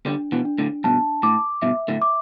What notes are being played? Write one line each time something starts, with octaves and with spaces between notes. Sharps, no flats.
D3 G3 D4
B2 E3
D4
A2 D3
G2 B2 A5
A2 D6
G2 B2 E5
A2 D3
D6